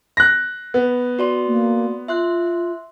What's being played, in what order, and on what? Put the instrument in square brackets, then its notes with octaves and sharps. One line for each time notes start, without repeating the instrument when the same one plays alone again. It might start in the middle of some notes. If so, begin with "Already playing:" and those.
[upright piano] F#6 A#6
B3
[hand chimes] F#4 D5 C6
[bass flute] A#3
[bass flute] F4 [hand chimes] E5 C6 F#6